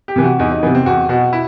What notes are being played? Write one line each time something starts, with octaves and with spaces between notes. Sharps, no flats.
G4
C3 E3
F#4
E2 D#4
D#4
C3 E3 B3
C4
E2 F#4
B2 F#4
E4